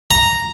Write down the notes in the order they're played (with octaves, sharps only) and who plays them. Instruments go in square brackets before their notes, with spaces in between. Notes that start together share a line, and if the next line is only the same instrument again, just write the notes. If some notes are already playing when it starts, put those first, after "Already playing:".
[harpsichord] A#5